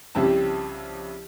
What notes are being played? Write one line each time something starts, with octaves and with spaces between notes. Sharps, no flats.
C2 C#3 F3 E4 G4 A5